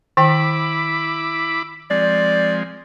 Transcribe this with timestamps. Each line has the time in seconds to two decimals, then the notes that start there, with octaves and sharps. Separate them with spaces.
0.17 D#3 E4 G5 B5 D6
1.90 F3 G#3 C4 D5